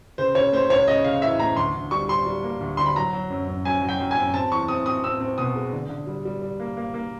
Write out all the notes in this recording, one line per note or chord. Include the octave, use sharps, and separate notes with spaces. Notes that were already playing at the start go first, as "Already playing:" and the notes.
C#3 C5
C#3 C#5
A3 C5
C#2 C#5
C#3 D#5
C#3 F5
E3 E5
A3 A#5
D2 C6
D2
G3 C#6
G3 C6
G3
A#3
D2
D3 C6
B5
F#3 A#5
F#3
F#2
F#2
F#2 G#5
F#3
G5
F#2
G#5
F#2
C4 A5
E2 C#6
C4 D#6
C4 D#6
C4 E6
C4
B2 D#6
G#3
D3
D3
G3
G3
G3
A#3
A#3
A#3